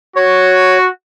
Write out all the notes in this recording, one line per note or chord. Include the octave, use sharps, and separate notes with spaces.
F#4 C#5